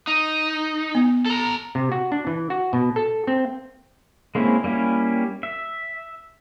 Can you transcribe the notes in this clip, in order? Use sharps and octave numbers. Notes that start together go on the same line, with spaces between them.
D#4
B3
A4 A#5
C3
F#4
D4
E3
F#4
B2
A4
C4
G#3 A#3 C4 C#4 E4
G3 A#3 C#4 E4
E5